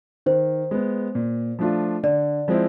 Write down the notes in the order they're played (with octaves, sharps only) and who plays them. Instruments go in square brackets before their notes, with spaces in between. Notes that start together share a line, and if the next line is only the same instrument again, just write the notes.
[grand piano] D#3 [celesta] C5
[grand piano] G#3 B3
A#2
F3 A3 D4 F4
[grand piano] D3 [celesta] D5
[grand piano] F3 G#3 C4 E4